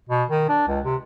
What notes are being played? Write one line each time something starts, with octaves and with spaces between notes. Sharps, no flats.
B2
D#3
D4
C#2
C3